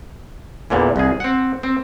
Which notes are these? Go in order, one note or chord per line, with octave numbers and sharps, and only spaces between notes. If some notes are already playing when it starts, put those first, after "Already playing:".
E2 A#2 D3 E3
C2 G#4
C4 F#5
C4